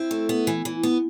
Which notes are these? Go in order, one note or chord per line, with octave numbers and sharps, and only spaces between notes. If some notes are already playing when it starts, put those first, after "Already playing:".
Already playing: C4 E4
A3
B3
E3
E3
B3